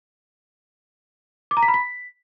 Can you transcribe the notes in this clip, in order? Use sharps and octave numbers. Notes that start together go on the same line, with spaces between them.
D6
A#5
B6
B5
B6